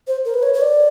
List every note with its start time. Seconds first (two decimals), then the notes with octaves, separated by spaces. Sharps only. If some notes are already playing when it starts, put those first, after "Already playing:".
0.07 C5
0.25 A#4
0.34 B4
0.43 C#5
0.54 C#5
0.61 D5